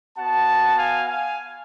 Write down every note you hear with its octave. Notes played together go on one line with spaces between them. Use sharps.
B3 F#4 F#5 A5
F5 G#5
F5 G#5